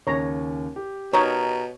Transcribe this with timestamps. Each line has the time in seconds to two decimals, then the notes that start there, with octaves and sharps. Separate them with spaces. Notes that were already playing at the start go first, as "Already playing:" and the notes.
0.07 D#2 C#3 C#4 C#5 A#5
0.76 G4
1.13 B2 D#4 A#4 C#5